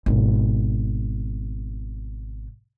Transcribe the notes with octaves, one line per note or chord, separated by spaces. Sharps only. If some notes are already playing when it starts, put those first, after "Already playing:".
G#1 B2